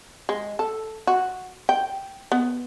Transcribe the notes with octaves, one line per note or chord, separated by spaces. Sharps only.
G#3
A4
F#4
G5
B3